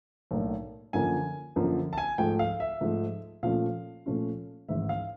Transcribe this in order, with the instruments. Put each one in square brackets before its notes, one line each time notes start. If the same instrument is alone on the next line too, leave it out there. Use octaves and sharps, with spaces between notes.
[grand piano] B1 A2 F#3 A#3 D4
F#2 D3 F3 A#3 G#5
F#2 D3 F3 A#3
A5
G#5
G#2 F3 A3 G5
F5
E5
G#2 F3 A3
A#2 F3 A3 C#4 F4 F5
A#2 F3 A3 C#4 F4
A1 G#2 D#3 E5
F5